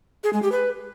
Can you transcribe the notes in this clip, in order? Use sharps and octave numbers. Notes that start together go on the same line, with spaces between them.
G#4
G#3
G4
B4